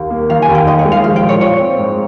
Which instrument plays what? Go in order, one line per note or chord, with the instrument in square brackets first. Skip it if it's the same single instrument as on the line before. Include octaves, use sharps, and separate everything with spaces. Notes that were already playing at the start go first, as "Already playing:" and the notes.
Already playing: [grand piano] D#2
A#3
[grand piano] D#3 [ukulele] F5
[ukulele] G#5
[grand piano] D#2
[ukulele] G5
[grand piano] D#2 [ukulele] D#5
[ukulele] C#5
[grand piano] G#3
[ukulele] F5
[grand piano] F3 [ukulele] F5
[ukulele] G5
[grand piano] A#2
[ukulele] C#5
[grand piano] A#2 [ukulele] C#5
[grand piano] C4
G#2